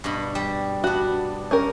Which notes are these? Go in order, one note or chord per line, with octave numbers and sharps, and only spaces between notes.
G2 B2
G3
B3 D4 F#4
C#4 G4 A#4